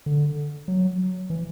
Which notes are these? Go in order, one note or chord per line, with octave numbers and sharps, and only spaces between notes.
D3
F#3
E3